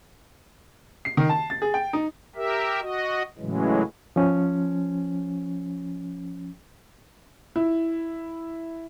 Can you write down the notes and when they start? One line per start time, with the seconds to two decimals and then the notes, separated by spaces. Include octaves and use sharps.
1.05 C7
1.17 D#3
1.29 A5
1.50 A6
1.62 G#4
1.74 G5
1.93 D#4
2.35 G4 A#4 E5
2.81 F#4 D#5
3.38 A2 C#3 E3 F#3 G#3
4.16 F3 C#4
7.56 E4